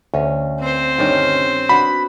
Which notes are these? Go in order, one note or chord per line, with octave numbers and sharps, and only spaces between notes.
D2 C#4
C4 C5
G2 D#3 C#4
B3 D4 F#4 B5